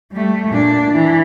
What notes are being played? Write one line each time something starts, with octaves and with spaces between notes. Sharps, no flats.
G3 A3
A#2 D4
E3